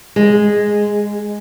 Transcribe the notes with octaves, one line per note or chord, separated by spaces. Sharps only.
G#3